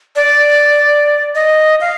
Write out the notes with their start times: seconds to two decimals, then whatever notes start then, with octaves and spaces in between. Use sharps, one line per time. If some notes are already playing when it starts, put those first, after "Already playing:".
0.16 D5
1.35 D#5
1.81 F5